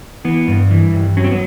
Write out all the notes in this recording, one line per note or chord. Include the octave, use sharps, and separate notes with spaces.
E3 B3
G2
E3
G2
F#3 C#4
C4
B3